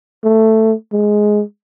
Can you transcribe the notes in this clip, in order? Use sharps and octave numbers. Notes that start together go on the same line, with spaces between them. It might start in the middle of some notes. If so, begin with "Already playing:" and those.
A3
G#3